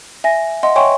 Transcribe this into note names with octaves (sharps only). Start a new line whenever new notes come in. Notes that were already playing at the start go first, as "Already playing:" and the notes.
E5 G#5 A#6
D#5 E5 F#5 C6
C#5 E5 G5 G#5 C6 C#6